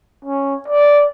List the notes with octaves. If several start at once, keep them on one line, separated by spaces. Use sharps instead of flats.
C#4
D5